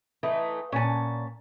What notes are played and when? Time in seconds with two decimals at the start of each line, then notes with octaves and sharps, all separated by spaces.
0.23 E3 A3 D#4 B4
0.72 A#2 C#4 F#5 G#5 A5